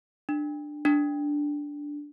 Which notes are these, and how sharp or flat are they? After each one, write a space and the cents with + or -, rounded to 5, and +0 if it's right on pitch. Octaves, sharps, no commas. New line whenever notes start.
D4 +15
D4 -10